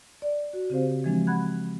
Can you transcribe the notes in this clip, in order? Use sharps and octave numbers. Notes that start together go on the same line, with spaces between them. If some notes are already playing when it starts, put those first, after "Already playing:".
D5
F#4
C#3 C4 G4 C5 F5
E3 F3 G#3 C4 D4
F#5 B5 F#6 G#6